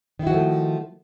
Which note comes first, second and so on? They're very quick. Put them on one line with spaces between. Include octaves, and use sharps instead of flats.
D#3 E4 F#4 F3 A3